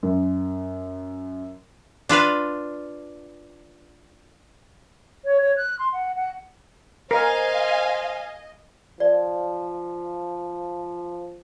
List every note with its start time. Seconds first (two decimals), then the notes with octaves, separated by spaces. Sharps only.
0.03 F#2
2.09 D4 F4 B4 F5
5.24 C#5
5.41 C#5
5.56 F#6
5.78 C6
5.92 F#5
6.15 F#5
7.11 A#4 C5 D#5 F5 G#5
9.00 F3 D5